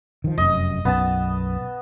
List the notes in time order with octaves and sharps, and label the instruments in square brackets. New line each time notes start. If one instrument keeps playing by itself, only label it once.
[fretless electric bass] D#3 F3
[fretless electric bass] F1 F#2 [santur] D#5
[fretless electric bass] B1 F#2 [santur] B3 A5